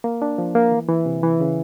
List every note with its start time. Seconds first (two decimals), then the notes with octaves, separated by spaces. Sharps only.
0.04 A#3
0.22 D4
0.38 F3
0.55 A#3
0.72 E3
0.89 E3
1.06 C3
1.23 E3
1.41 C#3